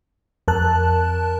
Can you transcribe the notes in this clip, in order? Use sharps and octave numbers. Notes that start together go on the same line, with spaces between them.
F2 A#4 A5 F#6